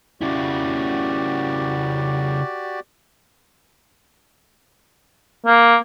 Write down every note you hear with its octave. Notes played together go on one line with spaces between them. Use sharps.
C#3 E4 F#4 G4 D5
A#3